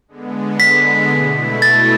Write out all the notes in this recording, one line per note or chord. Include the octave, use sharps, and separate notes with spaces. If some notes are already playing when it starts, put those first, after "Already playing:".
D3 G#3 B3
B6
B2 A3 E4
A6